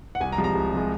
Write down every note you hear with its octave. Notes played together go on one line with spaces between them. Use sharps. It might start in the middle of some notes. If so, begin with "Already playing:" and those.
F#5
C2 G#5
A#5
C3 F3 G#3
A#5
C2
C3 F3 G#3